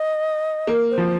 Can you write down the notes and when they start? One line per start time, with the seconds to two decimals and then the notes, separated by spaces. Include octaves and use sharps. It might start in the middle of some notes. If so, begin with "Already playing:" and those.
Already playing: D#5
0.67 A#3
0.91 C5
0.98 F3